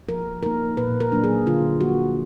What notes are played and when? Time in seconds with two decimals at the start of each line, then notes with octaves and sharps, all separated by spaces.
0.09 F3 A#4
0.43 A#3 D#4 A#4
0.77 A#2 B4
1.00 A#4
1.12 F#3 A#3 D4
1.24 G#4
1.46 D3 F4
1.81 F3 A#3 F#4